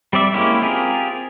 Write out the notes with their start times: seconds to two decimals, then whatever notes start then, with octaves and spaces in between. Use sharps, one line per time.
0.13 G3 C4 D5 E5
0.34 G#3 A#3 C#4 E4 G4
0.61 C4 F4 G4 G#4 A#4